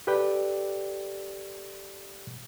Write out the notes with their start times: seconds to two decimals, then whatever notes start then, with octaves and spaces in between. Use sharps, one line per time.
0.07 G4 A4 B4 D5 G5